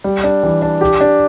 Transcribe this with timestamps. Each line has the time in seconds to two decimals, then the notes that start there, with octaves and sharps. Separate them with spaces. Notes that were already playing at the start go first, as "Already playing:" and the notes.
0.04 G3
0.24 D4
0.43 E3
0.62 D4
0.81 G4
1.01 D4